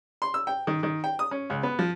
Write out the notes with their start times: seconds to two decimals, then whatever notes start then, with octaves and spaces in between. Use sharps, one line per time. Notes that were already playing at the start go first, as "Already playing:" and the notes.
0.22 C6
0.34 E6
0.47 G5
0.67 D#3
0.83 D#3
1.04 G5
1.19 D#6
1.31 C#4
1.50 C#2
1.63 B3
1.79 F3